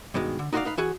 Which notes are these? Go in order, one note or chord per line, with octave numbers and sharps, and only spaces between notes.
G2 B2 D#3 G#3
D3
D#4 F#4 B4 C5 D5 F5
D#4 B4 F5
E3 F#4 G#4